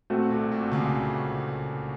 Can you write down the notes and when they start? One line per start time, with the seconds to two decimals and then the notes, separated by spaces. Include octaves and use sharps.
0.10 A#2 A3 C4 F#4
0.31 C2 C3
0.52 A#2
0.72 C#2 C#3